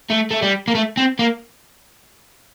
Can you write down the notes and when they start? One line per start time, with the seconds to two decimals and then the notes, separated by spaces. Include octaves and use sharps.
0.10 A3
0.31 A3
0.42 G3
0.68 A#3
0.75 A3
0.97 C4
1.19 A#3